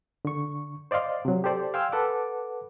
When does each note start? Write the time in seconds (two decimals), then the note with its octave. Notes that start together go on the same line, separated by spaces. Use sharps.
0.25 D3 C#6
0.91 C5 D5 D#5 F5 C6
1.25 C3 F#3
1.44 G4 A4 C5 D5
1.74 F5 G5 G#5 C6 E6 F6
1.92 A4 B4 F#5 D6